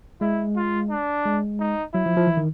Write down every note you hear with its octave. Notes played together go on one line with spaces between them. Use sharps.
G#3 E4
F4
D4
G#3
D#4
F#3 E4
F3
F3
E3
D#3